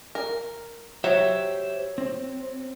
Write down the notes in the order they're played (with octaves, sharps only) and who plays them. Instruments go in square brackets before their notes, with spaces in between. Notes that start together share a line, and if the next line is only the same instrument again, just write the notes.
[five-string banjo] A#4
[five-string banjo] F#3 [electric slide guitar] G4 C5 E5
[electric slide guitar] C4